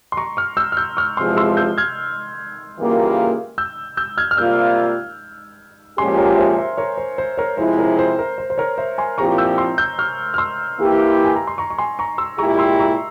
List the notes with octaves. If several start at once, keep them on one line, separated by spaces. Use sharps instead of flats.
C6
A#5 C#6
C#6 F6
E6 G6
F6
E6 G6
C#6 F6
E2 C3 F3 G#3 C6 E6
C6 E6
E6 G6
F6 G#6
C#3 E3 G3 A#3 F4
E6 G6
E6 G6
F6 G#6
F6
C3 G3 A#3 F4 E6 G6
A#2 F3 G#3 C#4 G4 G#5 C6
A#4 C#5
C5 E5
C5 E5
A#4 C#5
C5
C5
A#4 C#5
C3 F3 G#3 E4 C5
A#4 C#5
C5
A#4
C5
C5
A#4 C#5
C5 E5
G#5 C6
A#2 F3 C4 E4 G4 A#5 C#6
E6 G6
C6 E6
E6 G6
C#6 F6
F6
C6 E6
E3 A#3 E4 G4
G#5
A#5
C6
A#5 C#6
C#6
G#5 C6
A#5 C#6
C6 E6
A#2 G#3 E4 G4 A#5 C#6
C6 E6
A#5 C#6